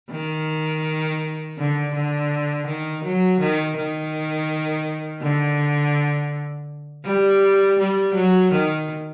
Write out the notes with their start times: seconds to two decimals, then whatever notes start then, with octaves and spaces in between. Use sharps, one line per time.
0.11 D#3
1.58 D3
1.94 D3
2.66 D#3
3.04 F#3
3.40 D#3
3.77 D#3
5.22 D3
7.05 G3
7.79 G3
8.14 F#3
8.52 D#3